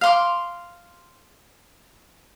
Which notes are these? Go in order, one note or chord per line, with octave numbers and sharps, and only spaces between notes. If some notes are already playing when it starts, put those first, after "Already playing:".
F5 C6 D6